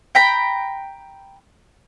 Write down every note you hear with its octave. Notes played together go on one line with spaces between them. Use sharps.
G5 A#5 B5